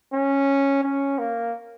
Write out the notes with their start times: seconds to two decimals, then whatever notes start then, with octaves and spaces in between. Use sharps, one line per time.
0.13 C#4
0.83 C#4
1.18 A#3